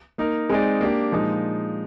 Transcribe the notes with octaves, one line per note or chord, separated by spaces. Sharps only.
A#3 D#4 A#4
G#3 C4 D#4 G#4 D5
A#3 D4 G4
A#2 F3 G#3 D#4